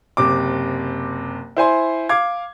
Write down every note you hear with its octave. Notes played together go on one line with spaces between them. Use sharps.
F#1 C3 D6
E4 C5 G#5 C6
F5 D6 G#6